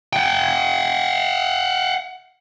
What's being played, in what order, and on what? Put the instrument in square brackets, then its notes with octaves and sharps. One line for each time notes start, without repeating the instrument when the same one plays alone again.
[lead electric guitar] F#5 G5